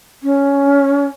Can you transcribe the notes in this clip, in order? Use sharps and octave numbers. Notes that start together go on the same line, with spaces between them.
C#4